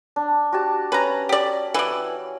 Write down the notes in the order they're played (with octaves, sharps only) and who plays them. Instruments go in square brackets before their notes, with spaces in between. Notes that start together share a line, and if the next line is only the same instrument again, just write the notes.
[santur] D4
F#4 G4 A5
[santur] C#4 [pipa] B4 A#5
[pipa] G4 D5
E3 D5